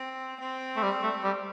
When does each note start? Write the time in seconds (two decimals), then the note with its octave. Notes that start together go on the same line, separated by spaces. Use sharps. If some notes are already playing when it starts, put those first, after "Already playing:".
Already playing: C4
0.40 C4
0.76 A3
0.83 G3
1.03 A3
1.24 G3